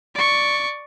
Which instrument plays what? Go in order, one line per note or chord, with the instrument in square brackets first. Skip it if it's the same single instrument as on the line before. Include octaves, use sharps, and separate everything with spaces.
[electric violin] D5 C#6